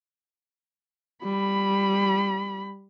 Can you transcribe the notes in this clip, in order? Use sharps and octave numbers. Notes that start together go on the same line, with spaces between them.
G3 B5